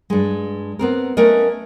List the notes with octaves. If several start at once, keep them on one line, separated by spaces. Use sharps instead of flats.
G2 G#3
B3 C4 A#4
A3 B3 C#4 A#4 D#5